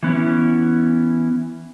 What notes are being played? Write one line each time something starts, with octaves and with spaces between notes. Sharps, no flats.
E3 B3 C#4 E4